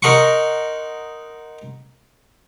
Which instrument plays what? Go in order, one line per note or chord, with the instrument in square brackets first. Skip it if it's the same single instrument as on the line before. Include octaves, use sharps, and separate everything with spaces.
[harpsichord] D#4 A#4 D#5 F#5 C6 C#6